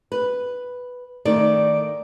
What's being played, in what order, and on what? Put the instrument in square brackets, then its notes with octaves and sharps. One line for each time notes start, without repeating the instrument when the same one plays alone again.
[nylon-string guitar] B4
[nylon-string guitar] D#3 D5 [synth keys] A3 D#4 D7